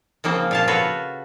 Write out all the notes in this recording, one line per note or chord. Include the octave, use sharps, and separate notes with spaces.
C#3 F3 A#3 C4
A#2 F5 A5
F4 F#4 A4 B4 C#5